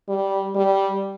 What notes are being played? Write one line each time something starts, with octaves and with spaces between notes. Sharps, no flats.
G3
G3